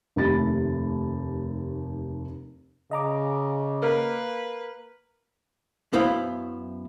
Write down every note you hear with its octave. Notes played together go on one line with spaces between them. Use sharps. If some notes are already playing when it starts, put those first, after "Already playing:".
F1 D#2 A3 G4 B5 A6
C#3 D#5 A#5 D6
A#3 A#4 B4
F#2 B3 E4 C5 F5